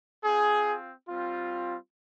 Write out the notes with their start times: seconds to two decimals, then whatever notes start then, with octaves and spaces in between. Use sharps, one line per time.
0.24 C4 F4 G#4
1.09 G3 C4 F4